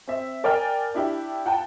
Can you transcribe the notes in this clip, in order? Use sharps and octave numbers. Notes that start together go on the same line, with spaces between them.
C4 E5
A#4 D5 G5 G#5 F6
D4 E4 G4
F4 F#5 G5 A5